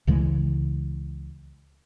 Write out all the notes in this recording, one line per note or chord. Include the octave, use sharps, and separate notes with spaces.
C#2 C#3 E3 G#3